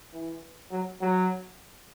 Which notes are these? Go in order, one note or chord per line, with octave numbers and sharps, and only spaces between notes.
E3
F#3
F#3